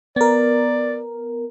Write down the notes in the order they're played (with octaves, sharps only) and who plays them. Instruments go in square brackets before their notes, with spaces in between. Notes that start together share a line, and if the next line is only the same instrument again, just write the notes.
[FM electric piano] B3 A#4 [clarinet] D5